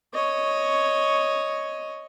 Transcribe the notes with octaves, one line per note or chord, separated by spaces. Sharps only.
C#5 D#5